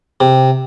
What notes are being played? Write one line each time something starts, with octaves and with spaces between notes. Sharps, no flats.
C3